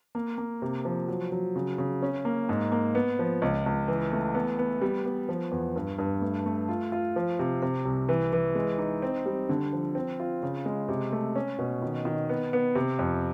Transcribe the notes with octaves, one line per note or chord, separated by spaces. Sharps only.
A#3
A#3
C3
F3
F#3
F#3
C#3
C#3
C#4
A#3
G#2
A#3
B3
F3
C#2
C#2
E3
A3
B3
B3
G3
B3
F3
E2
G2
G2
A3
A3
F4
F4
F3
C3
C3
C2
E3
E3
G#3
D#4
C4
G3
D3
F3
C4
F4
C#3
G#3
C3
A3
C#4
B2
D#3
D#3
B3
B3
C3
F2